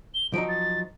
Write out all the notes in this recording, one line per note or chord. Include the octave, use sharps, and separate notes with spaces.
G7
F3 F#3 D#4 D7
A6